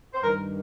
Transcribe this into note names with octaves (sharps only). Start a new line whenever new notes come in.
C5
G2 D#3 A#4